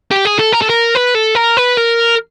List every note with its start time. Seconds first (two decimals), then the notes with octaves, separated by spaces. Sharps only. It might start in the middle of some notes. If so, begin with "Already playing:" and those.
0.11 G4
0.25 G#4
0.39 A4
0.52 A#4
0.61 A4
0.69 A#4
0.95 B4
1.15 A4
1.35 A#4
1.57 B4
1.77 A#4